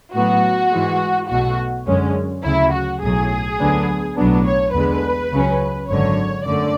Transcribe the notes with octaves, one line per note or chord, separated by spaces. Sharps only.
A2 F#3 B3 F#4
G#2 E3 G#3
B1 B2 A3 F#4
F#2 D3 G#3 C#4
D2 C#3 F#3 E4
F#4
B1 A2 F#3 G#4
D2 D3 F#3 B3 D4
B1 A2 F#3 B3 D4
C#5
E2 D3 G#3 B4
C#2 C#3 F#3 C#4
G#1 F#2 D3 F#3 C#5
F#2 D3 A3 D5